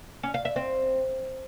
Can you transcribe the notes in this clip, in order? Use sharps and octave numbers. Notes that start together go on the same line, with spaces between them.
C#4
F5
E5
C4